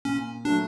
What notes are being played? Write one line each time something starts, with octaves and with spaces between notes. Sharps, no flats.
A#2 C#4
F#3 A3 D4